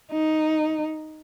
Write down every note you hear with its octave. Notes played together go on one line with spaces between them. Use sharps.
D#4